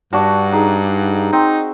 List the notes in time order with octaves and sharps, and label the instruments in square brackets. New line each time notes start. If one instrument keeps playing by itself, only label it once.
[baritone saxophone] G2 [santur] D4 F#4
[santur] D#4 G#4 D#5
[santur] C4 [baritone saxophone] D#4